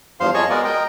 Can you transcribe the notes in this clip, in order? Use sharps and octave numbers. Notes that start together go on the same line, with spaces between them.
E2 G2 F3 C5 F5 C6
F2 G#4 C#5 D#5 A5 C#6
G#3 B3 F#4 A#4 D5 D#5
A#4 D#5 G5